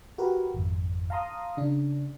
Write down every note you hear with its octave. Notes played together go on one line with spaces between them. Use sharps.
F#4 G4 A#4 B4
G#1 F2
F5 A5 A#5 C6 D#6
C#3 D4